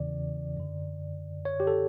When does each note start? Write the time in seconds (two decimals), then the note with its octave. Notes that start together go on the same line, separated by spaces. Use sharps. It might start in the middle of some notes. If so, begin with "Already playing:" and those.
Already playing: E2 C#3 E3 D5
0.57 F#2 D3
1.45 C#5
1.60 G4
1.67 A4